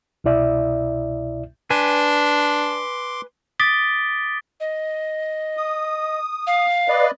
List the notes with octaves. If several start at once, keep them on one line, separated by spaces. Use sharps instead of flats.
C2 B2 E4 D5 E5
D4 B4 G#5 C6 D6
D6 D#6 A6 B6 D7 G7
D#5
D#6
F5
B4 D5 D#5